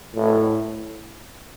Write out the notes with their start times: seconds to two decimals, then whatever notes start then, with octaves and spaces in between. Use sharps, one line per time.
0.16 A2